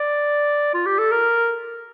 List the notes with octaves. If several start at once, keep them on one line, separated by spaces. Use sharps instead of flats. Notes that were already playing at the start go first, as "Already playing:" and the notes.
Already playing: D5
F4
G4
A4
A#4